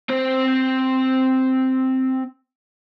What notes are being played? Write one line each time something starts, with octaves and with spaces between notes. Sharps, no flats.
C4 C5